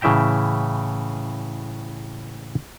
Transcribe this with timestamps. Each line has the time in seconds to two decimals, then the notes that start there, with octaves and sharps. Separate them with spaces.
0.01 A2 C#3 E3 E5 G5 A#5